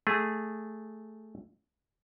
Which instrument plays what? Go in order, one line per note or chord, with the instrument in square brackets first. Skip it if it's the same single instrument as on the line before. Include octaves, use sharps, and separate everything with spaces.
[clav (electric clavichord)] A3 G#4